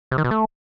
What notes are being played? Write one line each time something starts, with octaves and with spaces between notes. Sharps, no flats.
C3
D#3
B2
A3